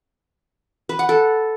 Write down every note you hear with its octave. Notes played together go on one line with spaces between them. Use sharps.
B4
F#5
A4